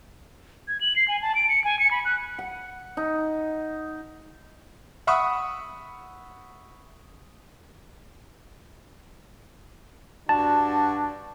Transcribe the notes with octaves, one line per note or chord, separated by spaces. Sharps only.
G#6
F#7
C7
G#5
A5
D7
C#7
G#5
C#7
B5
F#6
F#5
D#4
E5 F#5 B5 C#6 D#6 E6
G2 D4 F#4 A5